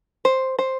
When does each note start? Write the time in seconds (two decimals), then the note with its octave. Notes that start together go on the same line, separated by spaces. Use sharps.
0.25 C5
0.59 C5